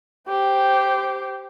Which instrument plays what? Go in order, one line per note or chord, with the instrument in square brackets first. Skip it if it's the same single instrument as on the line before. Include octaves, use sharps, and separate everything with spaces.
[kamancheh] G4 C5